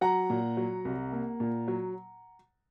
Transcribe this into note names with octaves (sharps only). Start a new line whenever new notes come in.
F#3 F#5 A#5
A#2
F#3
C2
A#3
A#2
F#3